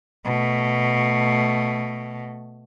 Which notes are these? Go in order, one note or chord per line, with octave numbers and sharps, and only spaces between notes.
B2 A3